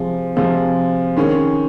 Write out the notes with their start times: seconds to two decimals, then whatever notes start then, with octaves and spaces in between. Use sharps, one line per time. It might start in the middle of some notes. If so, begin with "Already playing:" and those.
Already playing: C3 F3 G#3
0.36 C3 F3 G#3
1.17 D#3 G#3 C#4